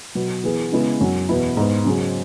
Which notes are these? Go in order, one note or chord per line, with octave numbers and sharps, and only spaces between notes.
B2 F#3 B3
E3 B3 G#4
C#3 G#3 B3 E4 G#4
F#2 F#3 C#4
E2 B2 B3 E4
G#2 G#3 B3
C#3 F#3 C#4 G#4